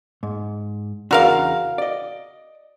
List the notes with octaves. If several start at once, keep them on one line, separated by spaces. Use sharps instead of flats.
G#2
E2 C#3 D4 F#4 A#4 F5
D5 D#5